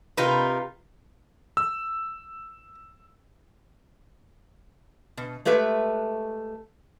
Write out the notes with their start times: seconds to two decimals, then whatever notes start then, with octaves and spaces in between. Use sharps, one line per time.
0.17 C3 D#4 F4 A#4 B4
1.57 E6
5.17 B2
5.45 G#3 A3 G4 B4 E5